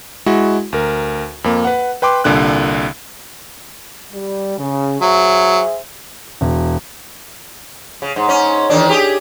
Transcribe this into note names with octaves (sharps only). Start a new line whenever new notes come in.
G#3 E4 F#4
D2 A#4
F2 A#3
B4 F#5
B4 G5 C6 D6
C2 A#2 D3 F#6
G3
C#3
F#3 G#4 C5 E5
E1
C#3
G#2
G#2 C#4
E2 D#3 D4
G4 G#4